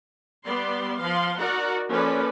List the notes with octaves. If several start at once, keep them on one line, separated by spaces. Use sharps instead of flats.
G3 B3 D5 C6
F3 F5 C6
D#4 F#4 A#4 D5 F#5 A#5
F3 A#3 C#4 A4 B4 D5